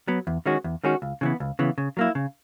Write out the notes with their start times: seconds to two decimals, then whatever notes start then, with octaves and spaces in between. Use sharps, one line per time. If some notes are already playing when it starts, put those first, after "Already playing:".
0.08 F#3 B3
0.27 E2
0.46 D#3 G#3 C#4 F#4
0.64 E2
0.84 D#3 G#3 C#4 F#4
1.02 C#2
1.21 C#3 E3 B3
1.40 C#2
1.59 C#3 E3 B3
1.78 C#3
1.97 F#3 A#3 E4
2.15 C#3